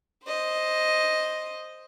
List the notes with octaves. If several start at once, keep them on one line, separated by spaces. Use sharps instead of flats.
C5 D#5